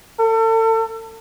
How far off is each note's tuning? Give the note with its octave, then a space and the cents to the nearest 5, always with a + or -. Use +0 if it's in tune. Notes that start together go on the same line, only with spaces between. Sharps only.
A4 +35